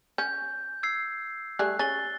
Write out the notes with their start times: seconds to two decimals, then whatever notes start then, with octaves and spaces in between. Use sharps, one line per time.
0.18 C#4 G6
0.83 E6 G#6 C7
1.59 G3 A3 G#4 F#6
1.79 C#4 G#4 A6 G7